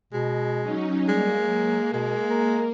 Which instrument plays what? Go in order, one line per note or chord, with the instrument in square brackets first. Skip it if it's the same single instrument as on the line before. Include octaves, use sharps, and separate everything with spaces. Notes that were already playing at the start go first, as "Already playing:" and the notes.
[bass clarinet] B2 [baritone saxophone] G#3
[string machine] F#3 C#4 D#4
[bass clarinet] G3 [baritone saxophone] G#3 [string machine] A#3
[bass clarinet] F#3
[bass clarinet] B2 [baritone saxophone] G#3
[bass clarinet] A#4